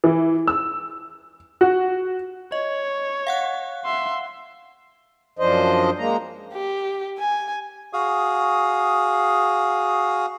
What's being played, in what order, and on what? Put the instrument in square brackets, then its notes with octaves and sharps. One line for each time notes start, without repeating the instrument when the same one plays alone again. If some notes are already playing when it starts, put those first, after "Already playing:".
[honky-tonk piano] E3
E6
F#4
[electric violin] C#5 [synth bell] D#5
[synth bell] F5 F#5 F#6
[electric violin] E5 C6
[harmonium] F#2 F3 D4 C5 D#5
G#3 A#3 A#5
[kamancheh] G4
G#5
[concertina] F#4 G#4 F5 D#6